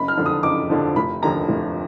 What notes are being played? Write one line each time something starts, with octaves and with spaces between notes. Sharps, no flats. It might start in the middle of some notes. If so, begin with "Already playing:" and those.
Already playing: F#1 B5
F6
F2 D3 F3
D#6
F#1 D6
F2 D3 F3
F1 B5
D#2 D3 F3 A#5
F1